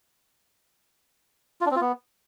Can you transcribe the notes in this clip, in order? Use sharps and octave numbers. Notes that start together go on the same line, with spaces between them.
F4
D4
C4
F4
B3